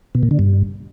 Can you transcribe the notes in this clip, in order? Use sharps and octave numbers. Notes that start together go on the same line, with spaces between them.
B2
A#2
D3
G2